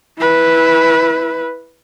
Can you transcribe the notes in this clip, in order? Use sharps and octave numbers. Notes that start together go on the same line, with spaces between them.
E4 B4